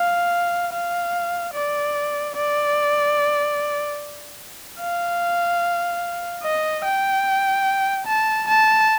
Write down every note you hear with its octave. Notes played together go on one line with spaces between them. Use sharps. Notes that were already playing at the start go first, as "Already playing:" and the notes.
Already playing: F5
F5
D5
D5
F5
D#5
G5
A5
A5